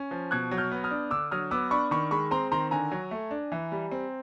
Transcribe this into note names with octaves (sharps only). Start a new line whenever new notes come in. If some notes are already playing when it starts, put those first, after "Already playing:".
Already playing: C#4
F3
B2 F#6 G#6
F#3
F6 G6
B3
D#6 F6
D4
D3 D6 E6
F#3 D#6 F6
B3 D6 E6
D4 B5 C#6
D#3 B5 C#6
G#3 B5 C#6
C4 A#5 C6
D#3 A#5 C6
D3 G#5 A#5
F#3
A3
D4
E3
G3
C4